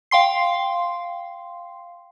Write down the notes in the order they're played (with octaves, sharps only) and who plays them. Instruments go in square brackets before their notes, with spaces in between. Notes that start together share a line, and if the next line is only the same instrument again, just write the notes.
[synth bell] F5 G5 C6 C7